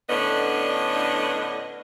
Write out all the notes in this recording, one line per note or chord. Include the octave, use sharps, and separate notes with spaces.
A2 D3 B3 C#4 D4 D#5